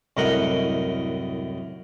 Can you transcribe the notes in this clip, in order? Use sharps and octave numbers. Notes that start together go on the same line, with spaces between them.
C2 F#2 A2 A#4 D#5 F#5